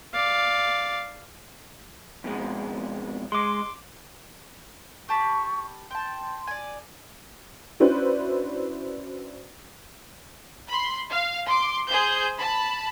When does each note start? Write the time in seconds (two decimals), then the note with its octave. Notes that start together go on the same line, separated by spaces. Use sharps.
0.14 D5 F5
2.24 F2 B2 G#3
3.32 G#3 C6 D6
5.09 G4 A5 B5 C#6
5.91 G5 A5 C6
6.47 D5 G#5
7.80 C#4 D4 E4 F#4 B4 C5
10.67 B5 C6
11.10 F5
11.46 C6 D6
11.87 G#4 C5 G6
12.38 A5 B5